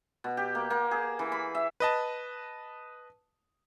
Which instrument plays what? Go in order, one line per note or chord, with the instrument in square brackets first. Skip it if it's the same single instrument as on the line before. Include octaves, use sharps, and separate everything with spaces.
[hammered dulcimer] B2
G4
A#3
A#3
G#4
E3
B5
E5
[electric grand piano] B4 D#5 A5